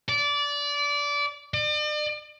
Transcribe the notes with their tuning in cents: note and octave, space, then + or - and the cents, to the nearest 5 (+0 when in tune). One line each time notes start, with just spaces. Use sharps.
D5 -20
D5 +40